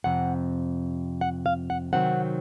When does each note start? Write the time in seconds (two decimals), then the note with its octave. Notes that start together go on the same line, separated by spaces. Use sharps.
0.04 F2 C3 F#5
1.21 F#5
1.46 F5
1.70 F#5
1.93 C3 D#3 F#3 C4 F#5